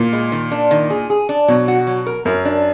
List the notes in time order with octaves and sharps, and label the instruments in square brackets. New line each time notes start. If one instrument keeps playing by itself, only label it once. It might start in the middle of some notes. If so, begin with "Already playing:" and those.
Already playing: [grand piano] A#2
[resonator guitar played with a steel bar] G#3
D#3
D4
D#3
G#4
G#4
D4
[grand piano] B2 [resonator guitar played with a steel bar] F#3
[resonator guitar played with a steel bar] F#4
F#3
A#4
[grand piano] F#2 [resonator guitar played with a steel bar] A#4
[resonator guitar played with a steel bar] D4